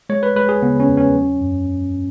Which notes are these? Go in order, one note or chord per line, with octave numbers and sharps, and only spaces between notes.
G#3 C#5
B4
G#3 B4
G#4
C#3 B3
C#4
E2
C#4
F#3
F#2